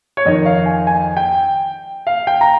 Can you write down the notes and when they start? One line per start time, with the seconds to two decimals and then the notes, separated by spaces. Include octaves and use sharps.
0.17 C#5
0.26 F2 D#3 D#5
0.46 F5
0.66 G#5
0.87 G#5
1.17 G5
2.07 F5
2.27 G5
2.41 A#5